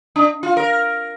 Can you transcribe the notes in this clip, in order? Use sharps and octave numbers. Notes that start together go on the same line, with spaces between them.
D4
F4
A#4